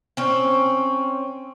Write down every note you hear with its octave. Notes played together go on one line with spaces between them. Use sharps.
C4 C#4